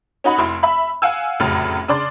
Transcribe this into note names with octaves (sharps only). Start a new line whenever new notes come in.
C#4 D#4 F#4 B5
F1 E4 C6
E5 B5
F5 F#5 G#5 E6
F1 F#2 A2 C#3 F6
C#3 D4 D5 C6